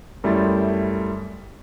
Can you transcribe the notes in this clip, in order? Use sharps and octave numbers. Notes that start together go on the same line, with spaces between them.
F#2 G3 A3 E4 C6 A6